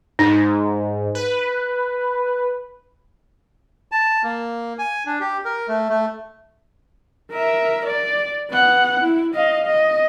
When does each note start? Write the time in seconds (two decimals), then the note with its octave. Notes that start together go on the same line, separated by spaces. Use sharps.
0.19 G#2 D#4
1.15 B4
3.92 A5
4.24 A#3
4.79 G#5
5.06 D4
5.20 G4
5.45 A#4
5.68 A3
5.89 A3
7.31 A#4 E5
7.86 D5
8.50 B3 F#5
9.00 E4
9.34 D#5 F5
9.66 D#5